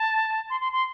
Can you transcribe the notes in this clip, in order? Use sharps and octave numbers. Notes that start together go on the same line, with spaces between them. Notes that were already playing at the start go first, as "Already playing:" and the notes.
Already playing: A5
C6
C6
C6